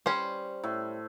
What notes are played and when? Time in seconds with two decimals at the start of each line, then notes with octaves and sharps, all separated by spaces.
0.06 G3 C#4 C5
0.63 A2